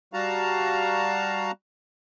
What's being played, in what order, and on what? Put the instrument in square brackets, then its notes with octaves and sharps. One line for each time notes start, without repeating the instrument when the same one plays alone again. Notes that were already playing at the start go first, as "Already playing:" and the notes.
[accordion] G3 F#4 F5 A5 A#5